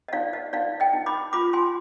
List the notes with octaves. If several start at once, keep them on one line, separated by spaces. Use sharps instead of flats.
D#5
D#4 D5 F5
D#5
D#4 D5 F5
D#5 G5
D#4
B5 D6
F4 B5 D6
G#5 C6